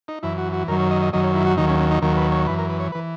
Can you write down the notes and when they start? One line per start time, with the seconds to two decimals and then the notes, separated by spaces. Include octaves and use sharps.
0.08 D#4
0.23 F#2 E3 E4
0.38 F#4
0.53 F#4
0.68 F#2 D#3 F#3 A#4
0.80 C#5
0.91 D#5
1.02 D#5
1.13 F#2 D#3 F#3 D#5
1.24 C#5
1.35 E4
1.46 F#4
1.57 D#2 D#3 F#3 D#4
1.69 C#4
1.79 C#4
1.91 D#4
2.02 D#2 D#3 F#3 A#4
2.17 B4
2.32 C#5
2.47 F#2 E3 B4
2.59 A#4
2.70 B4
2.80 C#5
2.92 B4
2.95 E3